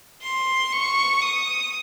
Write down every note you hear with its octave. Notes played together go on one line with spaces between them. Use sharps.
C6
C#6
D#6